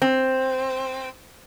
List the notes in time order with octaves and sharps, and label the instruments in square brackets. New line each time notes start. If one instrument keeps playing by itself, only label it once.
[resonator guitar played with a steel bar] C4